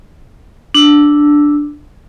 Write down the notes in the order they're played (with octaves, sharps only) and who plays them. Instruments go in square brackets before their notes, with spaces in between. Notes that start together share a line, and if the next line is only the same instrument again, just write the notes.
[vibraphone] D4 E6